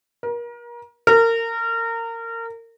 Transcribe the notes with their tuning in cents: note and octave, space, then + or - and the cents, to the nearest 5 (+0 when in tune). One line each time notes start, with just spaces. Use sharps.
A#4 +35
A#4 -25